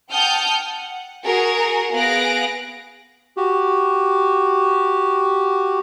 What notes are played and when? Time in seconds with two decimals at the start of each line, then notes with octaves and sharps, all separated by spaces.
0.11 F#5 G5 A5 D#6 F6 G6
0.67 F#5
1.24 F#4 G#4 A#4
1.92 B3 G#4 F5 F#6 A#6 D7
3.37 F#4 G4